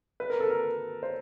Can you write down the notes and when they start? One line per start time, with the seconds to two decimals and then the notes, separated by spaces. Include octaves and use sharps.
0.20 B4
0.30 A#4
0.40 A4
0.50 A#4
1.03 C5